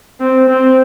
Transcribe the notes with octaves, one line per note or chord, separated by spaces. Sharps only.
C4
C4